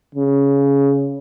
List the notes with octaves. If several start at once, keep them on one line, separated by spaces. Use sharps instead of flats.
C#3